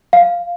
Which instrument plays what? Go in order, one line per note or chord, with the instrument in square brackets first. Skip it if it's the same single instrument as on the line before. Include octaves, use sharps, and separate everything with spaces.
[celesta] F5